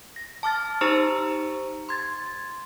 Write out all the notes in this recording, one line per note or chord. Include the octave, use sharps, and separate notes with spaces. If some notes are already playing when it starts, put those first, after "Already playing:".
A#6
A5 D6 F6 A6
D#4 G4 C5 A#5 C#6 E6
C6 G#6 A6